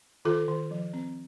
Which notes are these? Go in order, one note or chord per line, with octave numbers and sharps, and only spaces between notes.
D#3 F4 A4
D#3
F3
C4